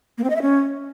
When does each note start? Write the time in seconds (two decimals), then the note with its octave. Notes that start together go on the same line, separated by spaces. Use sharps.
0.18 A#3
0.24 C4
0.30 D#5
0.36 E5
0.42 C#4